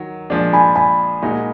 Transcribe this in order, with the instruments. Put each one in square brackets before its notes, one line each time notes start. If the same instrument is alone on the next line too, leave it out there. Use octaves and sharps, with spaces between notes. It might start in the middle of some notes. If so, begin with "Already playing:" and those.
Already playing: [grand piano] D#3 F#3
A#2 F3 G#3 D4
[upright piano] G#5 B5
G#5 B5
[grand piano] A#2 G#3 D#4 F#4